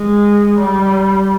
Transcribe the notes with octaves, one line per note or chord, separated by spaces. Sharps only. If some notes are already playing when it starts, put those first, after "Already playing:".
Already playing: G#3
G3